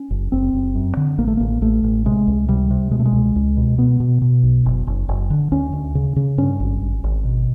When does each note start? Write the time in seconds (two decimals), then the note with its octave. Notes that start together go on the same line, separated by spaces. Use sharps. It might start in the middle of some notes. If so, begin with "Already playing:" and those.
Already playing: C#4
0.11 F#1
0.32 F#1 C4
0.53 F#1
0.75 F#2
0.97 D3
1.18 A1 A#3
1.28 A3
1.37 A1 A#3
1.61 A1 A3
1.83 A1
2.05 C3 G#3
2.27 C#2
2.48 C3 G3
2.70 C3
2.91 B2 G#3
2.99 A3
3.05 G#3
3.13 C#2
3.36 C#2
3.57 B2
3.78 B2 B3
4.00 B2
4.22 B2
4.43 B1
4.66 F#1
4.87 F#1
5.09 F#1
5.30 D3
5.52 D2 C#4
5.73 D2
5.95 C#3
6.16 C#3
6.38 G2 C#4
6.60 G#1
6.82 G#1
7.04 G#1
7.25 B2